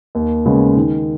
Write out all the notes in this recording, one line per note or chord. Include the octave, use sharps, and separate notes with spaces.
D#2
C#3 G#3 B3
D#3